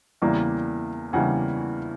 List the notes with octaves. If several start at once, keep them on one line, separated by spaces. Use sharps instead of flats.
E2 C#3 E3 G3 A#3 D5
E2 C#3 E3 G3 A#3 F#5 G#5